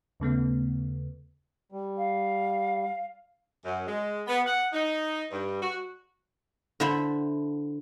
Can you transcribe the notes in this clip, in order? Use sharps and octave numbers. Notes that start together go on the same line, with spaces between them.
D#2 C#3 A3 B3
G3
F5
F#2
G#3
B3
F#5
D#4
G2
F#4
D3 E4 A4 C5 E5 B5